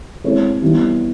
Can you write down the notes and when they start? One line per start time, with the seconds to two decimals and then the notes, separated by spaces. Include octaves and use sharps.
0.24 G#3 C4 E4 A4 C#5
0.62 E3 G3 B3